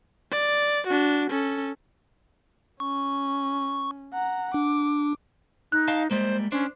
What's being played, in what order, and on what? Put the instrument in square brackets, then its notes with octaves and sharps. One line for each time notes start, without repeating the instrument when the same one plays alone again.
[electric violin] D5
D4 F#4
C#4 A4
[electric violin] C#4 [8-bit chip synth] C#6
[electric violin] F#5 A#5
[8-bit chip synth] D4 [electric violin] D6
[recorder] D#4 [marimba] F#6
[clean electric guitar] D#5 F5 A5
[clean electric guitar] G3 G#3 A#3 [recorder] C5
[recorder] C#4 [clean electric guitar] D4 C5